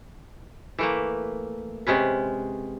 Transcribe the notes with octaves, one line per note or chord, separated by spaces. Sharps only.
E3 A3 A#3
C3 G#3 C#4 B4